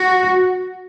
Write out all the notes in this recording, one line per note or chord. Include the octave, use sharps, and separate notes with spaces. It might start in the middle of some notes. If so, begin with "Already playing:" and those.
Already playing: F#4